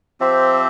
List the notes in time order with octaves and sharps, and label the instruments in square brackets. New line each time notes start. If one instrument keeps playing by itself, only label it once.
[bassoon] F3 [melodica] C4 G4 C5 E5